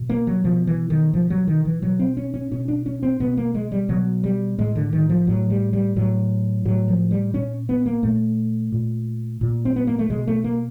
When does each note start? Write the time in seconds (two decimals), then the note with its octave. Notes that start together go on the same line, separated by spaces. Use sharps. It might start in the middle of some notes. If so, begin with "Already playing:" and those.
Already playing: B2
0.09 A#3
0.27 F#3
0.44 B2 F3
0.67 E3
0.90 D#3
1.13 B2 F3
1.30 F#3
1.47 D#3
1.65 E3
1.82 B2 F#3
1.99 C4
2.17 C#4
2.34 C#4
2.51 B2 C#4
2.68 D4
2.86 C#4
3.03 C4
3.20 B2 B3
3.37 A#3
3.55 G#3
3.72 G3
3.89 B2 F#3
4.24 G3
4.58 A2 G#3
4.76 D3
4.93 D#3
5.09 F3
5.27 A2 F#3
5.50 G3
5.73 G3
5.96 A2 F#3
6.65 A2 F#3
6.88 F3
7.11 G3
7.34 A#2 C#4
7.69 B3
7.86 A#3
8.03 A#2 A3
8.72 A#2
9.41 A#2
9.65 C4
9.76 B3
9.87 A#3
9.99 A3
10.10 B2 G#3
10.27 A3
10.44 A#3